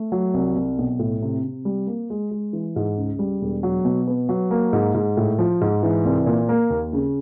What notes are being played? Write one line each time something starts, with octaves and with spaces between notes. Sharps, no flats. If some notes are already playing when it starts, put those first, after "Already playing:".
Already playing: A3
F#3
C2
C2
B1
A2
C3
C3
G3
A#3
G#3
G#3
E3
G#2
C#2
G3
E1
F#3
B2
B3
F#3
A#3
G#2
G#2
A2
F3
G#2
E3
C2
A#2
A#3
D#2
C#3